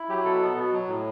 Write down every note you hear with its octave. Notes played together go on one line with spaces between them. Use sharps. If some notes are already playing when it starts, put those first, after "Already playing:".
Already playing: E4
F#3 G4
B2 A4
B3
B2
F#3
A2